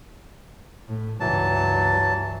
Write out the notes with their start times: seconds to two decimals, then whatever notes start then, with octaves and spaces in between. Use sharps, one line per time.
0.88 A2
1.20 C#2 G2 E3 F#3 A5